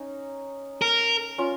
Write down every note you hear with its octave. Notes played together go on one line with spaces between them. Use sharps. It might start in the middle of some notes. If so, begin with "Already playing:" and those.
Already playing: C#4 D#4
A#4
C#4 F4